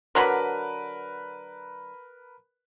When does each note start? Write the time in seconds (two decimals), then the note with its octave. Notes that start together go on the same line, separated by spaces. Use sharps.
0.15 D3 F#3 A#4 B4 B5